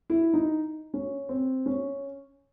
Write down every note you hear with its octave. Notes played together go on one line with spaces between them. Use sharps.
E4
D#4
C#4
C4
C#4